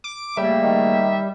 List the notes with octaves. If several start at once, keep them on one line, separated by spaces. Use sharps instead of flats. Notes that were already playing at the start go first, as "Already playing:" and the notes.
D6
C#3 G3 A3 A#3 E5
D#3